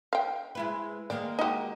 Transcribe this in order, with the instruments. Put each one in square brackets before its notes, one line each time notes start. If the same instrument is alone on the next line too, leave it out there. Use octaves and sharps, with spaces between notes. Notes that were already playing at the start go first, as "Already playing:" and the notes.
[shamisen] F5 G5
[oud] G#3 E4 B4
[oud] D#3 G#3 A#3 [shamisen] D5
[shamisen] D#4 F#4 [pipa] G4 D#5